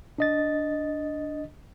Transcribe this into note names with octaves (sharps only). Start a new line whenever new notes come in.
D4 D#5 A6